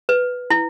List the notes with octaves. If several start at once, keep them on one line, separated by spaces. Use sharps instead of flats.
B4
E4